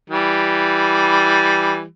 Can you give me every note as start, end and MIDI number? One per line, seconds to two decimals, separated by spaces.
0.10 1.83 52
0.10 1.83 55